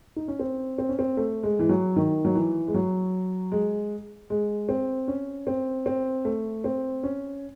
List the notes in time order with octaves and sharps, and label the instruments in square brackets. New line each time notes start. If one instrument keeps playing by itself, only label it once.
[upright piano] D#4
C#4
C4
C4
C#4
C4
A3
G#3
E3
F#3
D#3
F#3
E3
G#3
F#3
G#3
G#3
C4
C#4
C4
C4
A3
C4
C#4